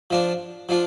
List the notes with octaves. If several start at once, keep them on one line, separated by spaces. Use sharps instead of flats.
F3 D4 F4
F3 D4 F4